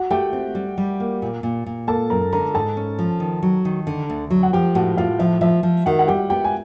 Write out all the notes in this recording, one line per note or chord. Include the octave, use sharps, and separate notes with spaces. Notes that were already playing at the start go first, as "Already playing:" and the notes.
Already playing: F#4 F#5
A3 G4 G5
C4
G3
G3
A#3
A#2
A#2
A#2
A#3 A4 A5
F#2 A#4 A#5
D3 A#4 A#5
G#2 A4 A5
C#4
F3
D#3
F#3
D#3
D3
D2
F#3
F#5
F3 G4 G5
A2 F#4 F#5
A2 F4 F5
F3 E5
F3 E5
F3
D#3 F#4 F#5
F#5
G3 G4 G5
B3 G4 G5
G#5